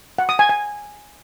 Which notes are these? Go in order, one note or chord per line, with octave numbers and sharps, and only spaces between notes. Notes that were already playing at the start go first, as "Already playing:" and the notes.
F#5
D#6
G#5
G#5